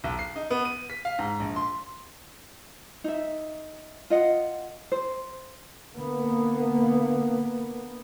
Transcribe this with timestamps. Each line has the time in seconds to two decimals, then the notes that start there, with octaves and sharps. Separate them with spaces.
0.04 B1
0.19 C7
0.36 D#4
0.51 B3
0.65 D#7
0.90 B6
1.05 F5
1.19 G#2
1.40 A#1
1.56 C6
3.04 D#4 E5
4.10 F4 D#5 F#5
4.92 C5
5.94 D3 A#3 B3